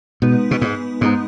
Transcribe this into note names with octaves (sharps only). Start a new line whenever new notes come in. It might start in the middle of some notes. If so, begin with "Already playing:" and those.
B2 G#3 B3 D#4 B4
B2
G#2
G#2 G#3 B3 D#4 B4